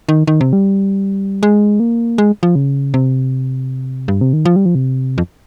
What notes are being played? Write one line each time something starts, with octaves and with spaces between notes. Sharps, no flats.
D#3
D#3
C3
G3
G#3
A#3
G#3
F3
C#3
C3
G2
C3
D#3
F3
G3
F3
C3
F2